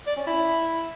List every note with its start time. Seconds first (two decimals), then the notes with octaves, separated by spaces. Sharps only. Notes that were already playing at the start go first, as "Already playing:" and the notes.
0.07 D5
0.17 C#4
0.27 E4